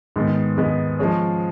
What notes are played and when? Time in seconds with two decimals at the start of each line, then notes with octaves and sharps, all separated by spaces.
0.16 G#2 D#3 G#3 B3
0.57 G#2 D#3 G#3 B3
0.99 F3 G#3 C#4